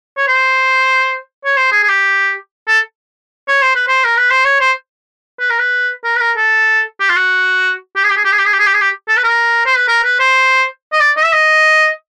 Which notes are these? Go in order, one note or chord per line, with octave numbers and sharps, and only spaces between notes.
C#5
C5
C#5
C5
G#4
G#4
G4
A4
C#5
C5
B4
C5
A#4
B4
C5
C#5
C5
B4
A#4
B4
A#4
B4
A#4
A4
G4
F4
F#4
G4
G#4
G4
G#4
G4
G#4
G4
G#4
G4
G#4
G4
G#4
G4
A4
B4
A#4
C5
B4
A#4
B4
C5
D#5
D5
D#5
E5
D#5